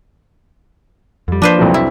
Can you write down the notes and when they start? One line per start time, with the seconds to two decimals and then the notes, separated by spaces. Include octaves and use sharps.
1.28 F2 G3
1.42 F3 A#3 D4 B4 C5
1.58 C2 F2 F#3
1.74 E4